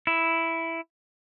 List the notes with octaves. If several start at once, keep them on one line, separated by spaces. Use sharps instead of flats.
E4